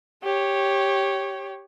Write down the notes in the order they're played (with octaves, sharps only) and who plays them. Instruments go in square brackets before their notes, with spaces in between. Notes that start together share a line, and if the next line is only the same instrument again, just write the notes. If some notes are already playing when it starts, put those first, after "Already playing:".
[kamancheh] G4 C#5